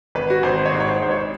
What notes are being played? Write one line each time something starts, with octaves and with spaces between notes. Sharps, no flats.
G#1 B4
F#4
G#1 C5
C5
C#5
G#2 C5
C#5
C5
C#5
G#2 C5
C#5
C5